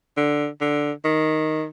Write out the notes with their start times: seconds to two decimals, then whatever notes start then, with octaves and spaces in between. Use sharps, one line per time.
0.17 D3
0.61 D3
1.04 D#3